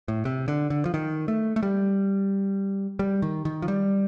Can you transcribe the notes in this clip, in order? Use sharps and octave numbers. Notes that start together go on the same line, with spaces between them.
A2
C3
D3
D3
F3
D#3
A3
A3
G3
G3
D#3
D#3
F3
G3